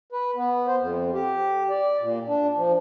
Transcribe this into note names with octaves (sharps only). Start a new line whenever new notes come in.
B4
B3
C5
F2
G4
D5
A#2
D4
F3